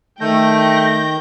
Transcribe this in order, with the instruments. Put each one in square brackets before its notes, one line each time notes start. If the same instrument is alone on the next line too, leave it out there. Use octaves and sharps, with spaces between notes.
[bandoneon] D#3 G6 [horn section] A3 [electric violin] G5 A#6